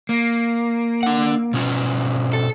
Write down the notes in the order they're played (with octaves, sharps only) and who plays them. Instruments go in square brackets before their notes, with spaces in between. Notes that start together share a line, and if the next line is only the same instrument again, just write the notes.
[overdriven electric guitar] A#3
[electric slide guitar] D4 F#5
B2 C#4 F4
[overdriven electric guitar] A4